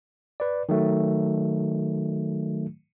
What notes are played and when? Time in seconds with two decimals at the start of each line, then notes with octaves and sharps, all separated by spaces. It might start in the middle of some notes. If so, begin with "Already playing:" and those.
0.40 B4 D5
0.69 D#3 F#3 A3